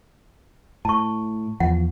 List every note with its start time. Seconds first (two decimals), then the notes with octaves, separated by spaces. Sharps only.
0.85 A2 A5 C#6
1.60 E2 E3 F3 F#5